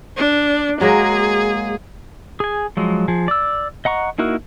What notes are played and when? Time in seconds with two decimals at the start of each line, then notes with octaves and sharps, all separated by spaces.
0.17 D4
0.81 F#3 G#3 A#3 G#4
2.40 G#4 G#5
2.77 F3 F#3 G#3
3.08 F3 G#4
3.28 D5 E6
3.85 D#5 F#5 A#5 C#6
4.18 A#3 D#4 E4 F#4 A#4